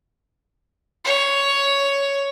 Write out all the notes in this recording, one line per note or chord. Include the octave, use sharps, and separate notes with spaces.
C#5